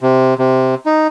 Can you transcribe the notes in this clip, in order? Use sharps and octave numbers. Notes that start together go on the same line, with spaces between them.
C3
C3
D#4